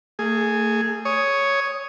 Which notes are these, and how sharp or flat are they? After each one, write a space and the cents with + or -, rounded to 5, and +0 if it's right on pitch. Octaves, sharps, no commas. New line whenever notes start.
A3 +40 G#4 +0
C#5 +0 D#6 +5